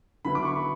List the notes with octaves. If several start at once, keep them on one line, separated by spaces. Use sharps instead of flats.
D3 F#3 B3 E4 B5
D6
C#6
B5